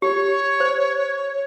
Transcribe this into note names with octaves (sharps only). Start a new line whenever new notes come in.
G4 C#5
C5